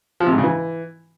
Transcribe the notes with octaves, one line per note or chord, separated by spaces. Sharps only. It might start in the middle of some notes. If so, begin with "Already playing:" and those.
F3
C3
G#2
C#3
E3